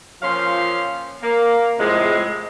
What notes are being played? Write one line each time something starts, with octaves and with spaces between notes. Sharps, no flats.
A#2 F3 C#4 F5 C6
A#3
A2 C3 F3 G#3